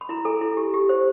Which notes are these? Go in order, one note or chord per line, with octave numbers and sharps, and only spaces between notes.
B5
E4 A#5
A4 G#5
E4
G4
G4
C5